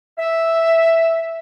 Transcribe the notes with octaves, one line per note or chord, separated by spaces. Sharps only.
E5